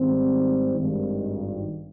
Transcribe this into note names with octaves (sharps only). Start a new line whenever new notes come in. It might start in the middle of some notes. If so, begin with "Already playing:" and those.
Already playing: G#2 D#3 G3 C4
G#1 G2 D#3